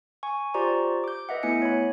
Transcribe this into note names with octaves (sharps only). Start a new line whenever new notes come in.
G#5 C#6
F4 G4 C5 D5 A#5 C#6
D6 G6
B4 D#5 E5 F#5
A3 B3 E4 G#5 C#7
C#5 B5